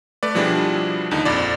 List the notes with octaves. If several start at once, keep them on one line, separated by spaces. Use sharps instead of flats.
A3 B4 D5
B2 F3 G3 D4 E4 G#4
D#2 D3 D#4
A#1 F2 D5